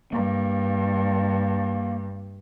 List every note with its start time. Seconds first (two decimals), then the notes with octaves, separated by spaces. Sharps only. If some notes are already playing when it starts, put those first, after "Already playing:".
0.13 G2 A#3